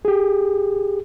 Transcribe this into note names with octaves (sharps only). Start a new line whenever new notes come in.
G4 G#4